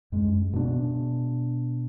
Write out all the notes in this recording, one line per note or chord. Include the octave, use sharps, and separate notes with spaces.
F#2 G#3
B2 B3 D4